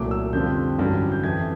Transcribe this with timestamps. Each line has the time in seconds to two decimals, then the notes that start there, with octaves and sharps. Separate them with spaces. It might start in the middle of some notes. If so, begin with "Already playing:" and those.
Already playing: C2 A#2 F#3 A3 D6
0.11 E6
0.33 F2 D3 G3 C4 F4 G6
0.78 A1 G2 D3 F#3
1.11 G6
1.23 F2 C3 E3 G#6